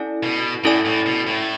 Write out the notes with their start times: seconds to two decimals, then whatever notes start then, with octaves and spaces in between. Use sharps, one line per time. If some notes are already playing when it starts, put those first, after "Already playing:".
Already playing: C#4 E4 A4 D5 G#5
0.23 B2
0.64 A2 C#4 E4 A4 D5 G#5
0.85 A2
1.06 B2
1.27 A2